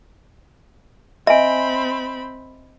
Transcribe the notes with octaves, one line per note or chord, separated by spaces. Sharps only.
C4 D#5 E5 G#5 B5